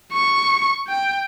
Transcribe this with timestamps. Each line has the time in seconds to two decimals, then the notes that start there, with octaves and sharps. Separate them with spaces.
0.13 C#6
0.87 G5